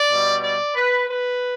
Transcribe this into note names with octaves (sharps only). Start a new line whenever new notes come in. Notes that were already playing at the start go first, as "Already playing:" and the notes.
Already playing: D5
B2 G3
D5
B4
B4